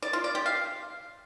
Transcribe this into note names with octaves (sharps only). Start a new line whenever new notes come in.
D5
F4
D5
G4
F5